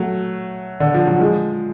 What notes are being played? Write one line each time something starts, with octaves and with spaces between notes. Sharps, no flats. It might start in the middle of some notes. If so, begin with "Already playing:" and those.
Already playing: F#3 A3
D3
F3
F#3
F3 G#3